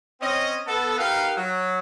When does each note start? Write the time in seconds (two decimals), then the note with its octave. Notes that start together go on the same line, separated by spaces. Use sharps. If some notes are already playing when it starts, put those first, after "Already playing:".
0.21 C4 C#4 D#5
0.67 B3 A4
0.98 D#4 G4 A#4 B4 F5
1.37 F#3